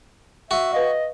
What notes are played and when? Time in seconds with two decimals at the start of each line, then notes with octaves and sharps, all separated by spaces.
0.51 F#4 E5
0.73 B4 D#5 F5